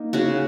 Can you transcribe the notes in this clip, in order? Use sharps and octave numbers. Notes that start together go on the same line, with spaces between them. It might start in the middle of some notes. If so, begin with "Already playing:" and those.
Already playing: A#3 D#4
C#3 F#4